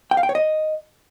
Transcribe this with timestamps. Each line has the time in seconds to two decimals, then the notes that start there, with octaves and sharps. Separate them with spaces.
0.11 G5
0.17 F5
0.23 G5
0.29 C#5
0.35 D#5